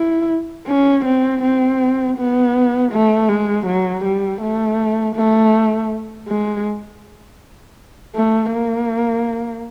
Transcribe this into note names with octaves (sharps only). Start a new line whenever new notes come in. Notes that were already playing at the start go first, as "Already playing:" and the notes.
Already playing: E4
C#4
C4
C4
B3
A3
G#3
F#3
G3
A3
A3
G#3
A3
A#3